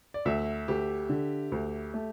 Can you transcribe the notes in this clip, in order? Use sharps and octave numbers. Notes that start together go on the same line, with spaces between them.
D5
D2 E5
D2 G4
D3
D2
A3